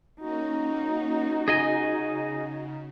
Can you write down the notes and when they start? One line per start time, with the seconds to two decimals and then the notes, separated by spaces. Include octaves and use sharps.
0.20 A#3 C#4 D#4 F#4
1.48 C#3 G#4 D#5 G#5